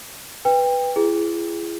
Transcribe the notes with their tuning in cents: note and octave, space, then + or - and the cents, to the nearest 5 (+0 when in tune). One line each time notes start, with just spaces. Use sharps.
B4 +0 G5 +25
E4 +40 G#4 +0